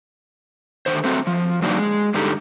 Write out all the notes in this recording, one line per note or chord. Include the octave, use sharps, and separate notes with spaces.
D3 D#3 C5
A3 C4 F#4 A4
F3
F#2 D3 F#3 A#3 D4 D#4
G#3
G2 D3 D#4 G4 A4 A#5